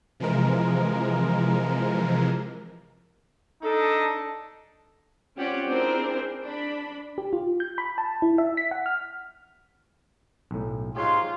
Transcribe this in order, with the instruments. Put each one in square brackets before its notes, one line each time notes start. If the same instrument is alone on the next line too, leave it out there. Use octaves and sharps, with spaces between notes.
[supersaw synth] C3 E3 F3 G#3 A#4
[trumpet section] D4 D#4 D#5 [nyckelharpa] A4
[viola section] C4 C#4 F4 G4 D5 F#5
C4 D4 E4 G#4 A#4 C5
D4 B5
[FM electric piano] G4
F4
G6
B5
A5
E4
E5
B6
F#5
F6
[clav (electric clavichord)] B1 A2
[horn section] G#2 C6 [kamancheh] F4 [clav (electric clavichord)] G4 G#4 C#5